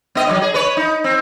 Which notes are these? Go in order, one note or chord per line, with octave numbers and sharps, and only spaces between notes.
B3 D#5
D#2 F#3
G#4
B4 C#5
D#4
C4